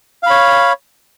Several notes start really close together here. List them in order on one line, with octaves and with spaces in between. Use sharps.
F5 B5 C#5